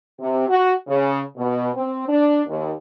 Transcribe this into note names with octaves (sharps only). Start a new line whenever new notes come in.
C3
F#4
C#3
B2
C4
D4
D#2